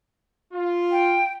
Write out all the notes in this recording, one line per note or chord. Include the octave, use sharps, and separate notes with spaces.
F4
G5